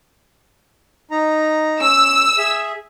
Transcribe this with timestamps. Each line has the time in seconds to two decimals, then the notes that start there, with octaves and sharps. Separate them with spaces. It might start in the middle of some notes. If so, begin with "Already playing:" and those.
1.11 D#4 A#5
1.80 C#4 E6
2.38 G#4 E5